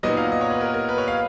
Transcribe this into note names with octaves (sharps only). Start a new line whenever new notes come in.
A#2 F#3 B3 D#4 D#5
F5
D#5
C#5
B4
A#4
A#4
B4
C#5
F5